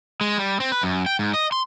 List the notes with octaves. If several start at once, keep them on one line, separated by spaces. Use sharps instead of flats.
G#3
G3
C4
B4
F#2
G5
G#2
D#5
C6